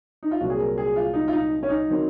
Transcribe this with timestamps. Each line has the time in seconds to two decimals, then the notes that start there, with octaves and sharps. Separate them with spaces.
0.23 D#4
0.31 F4
0.41 C2 A#2 F#3 C4 F#4
0.50 G#4
0.59 A#4
0.78 G#4
0.96 F4
1.13 D#4
1.28 F4
1.33 D#4
1.63 C#4
1.69 D#4
1.90 D#3 F#3 C4